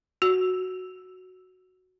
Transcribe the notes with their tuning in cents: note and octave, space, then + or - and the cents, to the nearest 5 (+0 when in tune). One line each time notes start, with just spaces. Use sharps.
F#4 +0